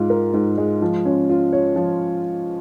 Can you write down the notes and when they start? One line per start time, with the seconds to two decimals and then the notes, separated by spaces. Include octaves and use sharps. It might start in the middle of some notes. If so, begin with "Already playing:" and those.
Already playing: G#2 G#3 F4
0.10 A#4
0.34 G#2
0.58 G#3
0.82 F3
1.05 C#4
1.29 F4
1.53 C#5
1.76 F3